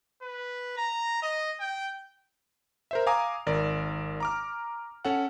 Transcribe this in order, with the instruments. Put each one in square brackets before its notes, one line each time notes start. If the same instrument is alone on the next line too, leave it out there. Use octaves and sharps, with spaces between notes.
[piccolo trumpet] B4
A#5
D#5
G5
[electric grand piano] A#4 C5 E5
F5 G#5 A#5 D6 D#6
G#1 A#4 D5
A#5 D6 F6
C#4 A4 F#5